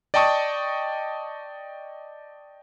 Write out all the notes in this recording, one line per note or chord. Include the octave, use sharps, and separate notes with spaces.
D5 D#5 G5 A5 C#6 D#6